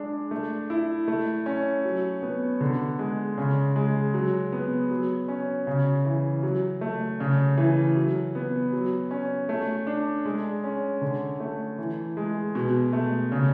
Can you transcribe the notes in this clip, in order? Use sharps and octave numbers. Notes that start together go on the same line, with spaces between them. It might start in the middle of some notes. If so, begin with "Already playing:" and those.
Already playing: G#3 D4
A3
E4
A3
C#4
F#3
B3
D3
G#3
C#3
G#3
F#3
B3
F#3
C#4
C#3
E3
F#3
A3
C#3
E3
F#3
B3
F#3
C#4
A3
D4
G#3
C#4
D3
A3
E3
G#3
B2
A3
C#3